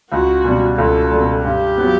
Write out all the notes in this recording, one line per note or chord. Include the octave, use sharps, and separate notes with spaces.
C#2 F#4
B2 G3
C#2 A4
B2 G3
G2 G4
F#3 B3